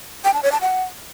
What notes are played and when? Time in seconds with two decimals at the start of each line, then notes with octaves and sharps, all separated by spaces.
0.24 G5
0.33 A5
0.43 C#5
0.52 A5
0.61 F#5